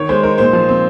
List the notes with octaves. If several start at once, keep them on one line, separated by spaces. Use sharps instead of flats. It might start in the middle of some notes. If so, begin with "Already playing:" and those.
Already playing: D#3 C#5
G#3 C5
D#4 A#4
A#2 C5
F3
C4